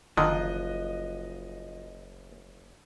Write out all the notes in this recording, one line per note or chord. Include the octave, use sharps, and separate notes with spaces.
F#1 D3 D#3 F3 D#5 F#6